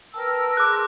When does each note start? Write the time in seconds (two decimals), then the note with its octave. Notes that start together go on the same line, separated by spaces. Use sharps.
0.14 A#4 B4 G5 A5 E6
0.57 G#4 A5 C6 D6 F#6